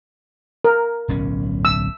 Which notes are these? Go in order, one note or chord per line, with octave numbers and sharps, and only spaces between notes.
A#4
D1 B1 C#4
E6